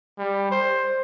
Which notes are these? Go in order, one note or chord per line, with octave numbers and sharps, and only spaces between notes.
G3
C5